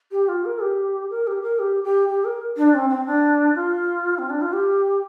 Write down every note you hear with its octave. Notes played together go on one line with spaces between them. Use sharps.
G4
F4
A#4
G4
A#4
G4
A#4
G4
G4
G4
A#4
D4
C4
C4
D4
F4
C4
D4
F4
G4